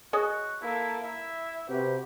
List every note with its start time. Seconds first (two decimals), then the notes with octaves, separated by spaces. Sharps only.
0.13 F#4 G#4 C#5 D#5
0.62 A#3 E4 A4
1.04 E4 E5
1.70 C3 F#4 G4 B4